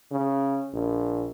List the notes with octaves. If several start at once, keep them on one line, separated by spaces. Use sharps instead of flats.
C#3
A#1